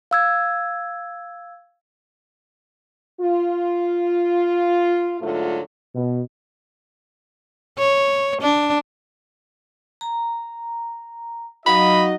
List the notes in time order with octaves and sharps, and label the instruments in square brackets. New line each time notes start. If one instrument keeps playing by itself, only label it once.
[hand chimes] F5 E6 G#6
[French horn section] F4
G#2 D3 F#3 A3 F4
[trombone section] B2
[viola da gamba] C#5
D4
[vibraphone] A#5
[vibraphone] F#3 F5 [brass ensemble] D#4 F#4 D#5 [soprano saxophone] B5